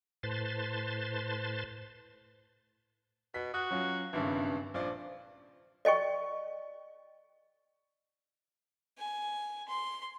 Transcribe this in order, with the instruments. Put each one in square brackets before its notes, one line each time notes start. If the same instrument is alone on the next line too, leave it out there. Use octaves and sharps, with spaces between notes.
[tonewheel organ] A2 B4 C5 A5 C6 A6
[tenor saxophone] B2 [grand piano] B6
[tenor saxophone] F#4 [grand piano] D#6 F#6
[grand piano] F#3 C#4 F4
[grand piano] G#1 G2 C#3 [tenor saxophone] E3
[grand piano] A#1 D4 D5 [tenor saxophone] F3
[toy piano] D5 D#5 G5 C#6
[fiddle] G#5
C6